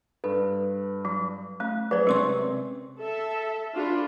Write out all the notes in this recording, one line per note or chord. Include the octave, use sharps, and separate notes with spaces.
G2 A4 B4
F#3
A3 C#4
F#3 G#4 B4 C5 D5
C3 G#3 C#4 A#4 C6 C#6
A4 E5
D4 F4 F#4 G#4 B4